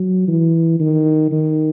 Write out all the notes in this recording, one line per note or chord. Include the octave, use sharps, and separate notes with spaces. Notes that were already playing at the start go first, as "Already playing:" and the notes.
Already playing: F#3
E3
D#3
D#3